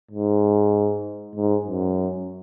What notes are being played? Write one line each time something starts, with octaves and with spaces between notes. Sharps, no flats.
G#2
G#2
F#2